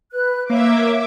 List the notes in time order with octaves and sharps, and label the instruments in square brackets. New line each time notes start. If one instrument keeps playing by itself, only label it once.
[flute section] B4 F#6
[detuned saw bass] A#3 [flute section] C#5 F5 [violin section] E5 D6